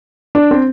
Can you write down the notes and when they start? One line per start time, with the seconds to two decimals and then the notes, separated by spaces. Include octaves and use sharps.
0.35 D4
0.51 C4